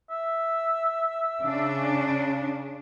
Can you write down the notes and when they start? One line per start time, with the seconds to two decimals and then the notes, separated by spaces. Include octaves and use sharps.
0.10 E5
1.42 C#3 D4